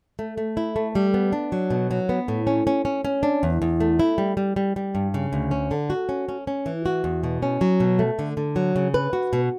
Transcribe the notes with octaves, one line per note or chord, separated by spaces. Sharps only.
A3
A3
E4
A3
G3
B3
D4
F#3
B2
F#3
B3
A2
C#4
C#4
C#4
C#4
D4
E2
E2
A3
E4
G3
G3
G3
G3
G2
C#3
D2
C#4
D3
F#4
C#4
C#4
C#4
E3
F#4
E2
B2
C#4
F#3
B2
A3
D3
D3
F#3
C#3
B4
F#4
B2